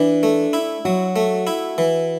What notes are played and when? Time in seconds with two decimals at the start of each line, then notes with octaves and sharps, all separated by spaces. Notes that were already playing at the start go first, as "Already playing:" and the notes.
Already playing: E3 D4
0.23 A3
0.53 E4
0.85 F#3 F#4
1.16 A3
1.47 E4
1.78 E3